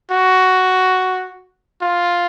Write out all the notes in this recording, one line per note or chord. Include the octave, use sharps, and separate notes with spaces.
F#4
F4